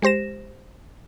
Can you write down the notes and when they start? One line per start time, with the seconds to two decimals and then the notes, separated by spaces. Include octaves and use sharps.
0.02 G#3 G4 C5 A#6 E7